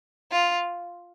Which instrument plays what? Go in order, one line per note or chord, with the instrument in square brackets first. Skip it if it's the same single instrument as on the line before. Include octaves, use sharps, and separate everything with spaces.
[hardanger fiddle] F4